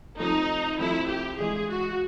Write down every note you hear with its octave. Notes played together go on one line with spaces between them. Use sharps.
C3 F3 A3 D#4
C3 F3 A3 E4
G4
G2 E3 G#3 G#4
F#4